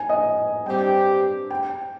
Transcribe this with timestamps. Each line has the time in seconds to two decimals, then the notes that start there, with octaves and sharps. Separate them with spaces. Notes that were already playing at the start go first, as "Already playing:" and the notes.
Already playing: G#5
0.09 D#5
0.66 G2 G3 C4 G4 G5
1.50 G5